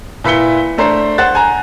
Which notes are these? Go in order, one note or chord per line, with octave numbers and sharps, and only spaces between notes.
A#2 E4 B4 B6 C#7 G7
A3 D4 C5 A#5 C7
C5 F#5 F#6 A6
G#5 A#5